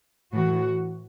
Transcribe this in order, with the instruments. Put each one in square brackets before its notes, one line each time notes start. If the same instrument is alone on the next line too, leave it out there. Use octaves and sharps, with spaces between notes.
[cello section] A2 E3 F#4